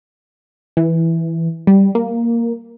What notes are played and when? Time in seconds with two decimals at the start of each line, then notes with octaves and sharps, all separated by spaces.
0.77 E3
1.67 G3
1.95 A#3